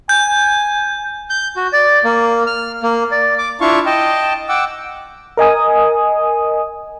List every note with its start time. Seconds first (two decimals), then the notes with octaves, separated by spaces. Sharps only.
0.09 G#5 G6
1.30 G6
1.56 F#4
1.73 D5
2.04 A#3
2.47 F6
2.83 A#3
3.12 D5
3.38 D6
3.61 D4 E4 F4 F5 C#6
3.86 D#5 G5 A5
4.49 F#5 G5 D6 E6
5.37 A#4 D#5 G#5 D#6